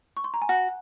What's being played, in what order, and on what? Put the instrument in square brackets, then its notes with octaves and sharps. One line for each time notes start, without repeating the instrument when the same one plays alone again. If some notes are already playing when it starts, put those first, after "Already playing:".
[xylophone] C#6
C6
A#5
G#5
[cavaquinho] F#4 [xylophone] F#5